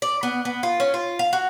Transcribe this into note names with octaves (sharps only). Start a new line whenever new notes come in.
D5
B3
B3
F4
C#4
F4
F5
F#4